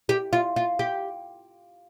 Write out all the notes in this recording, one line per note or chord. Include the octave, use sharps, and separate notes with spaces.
G4
F4
F4
G4